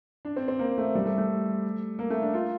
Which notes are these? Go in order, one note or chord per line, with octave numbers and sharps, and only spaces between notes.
D4
C4
C4
A#3
A3
G3
A3
A3
A#3
A3
D4
F4